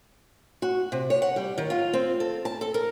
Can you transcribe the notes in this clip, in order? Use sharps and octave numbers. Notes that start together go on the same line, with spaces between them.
F#4
C3
C#5
F#5
G3
D#3
F4
C4
A4
A5
A4
A#4